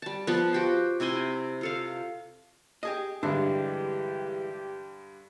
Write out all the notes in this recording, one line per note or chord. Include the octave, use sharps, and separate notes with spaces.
G3 A5
F3 B3 A5
F#4 G4 C5
C3 E4 G#5 C6
F4 A4 F5
G4 G#4 D#5
G2 D3 E3 G#3 D4 E4 G4